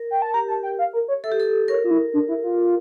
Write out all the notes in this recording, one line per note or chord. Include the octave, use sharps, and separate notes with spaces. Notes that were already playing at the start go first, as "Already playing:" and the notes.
Already playing: A#4
G5
A5
G4 A#5
A5
G5
F5
A#4
C#5
A4 E5
G4
A4
A#4 C#5
F4
E4
D4
E4
F4